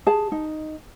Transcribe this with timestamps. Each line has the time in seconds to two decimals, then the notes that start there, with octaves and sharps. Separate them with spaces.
0.07 G#4 A5
0.32 D#4